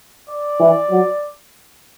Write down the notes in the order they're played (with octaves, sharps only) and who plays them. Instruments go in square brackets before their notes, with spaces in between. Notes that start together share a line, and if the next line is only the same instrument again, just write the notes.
[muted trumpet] D5
[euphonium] E3
F#3